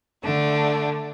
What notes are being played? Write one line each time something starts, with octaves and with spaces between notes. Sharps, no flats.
D3 A3 D4